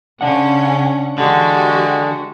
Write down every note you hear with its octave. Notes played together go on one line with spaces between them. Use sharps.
C#3 C#4 D4 F#5
D3 E3 G#3 F#4 G4